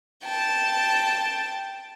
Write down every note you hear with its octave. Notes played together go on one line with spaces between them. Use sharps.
G5 A5